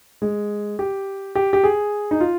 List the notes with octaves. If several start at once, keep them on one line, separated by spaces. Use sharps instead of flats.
G#3
G4
G4
G4
G#4
D#4
F4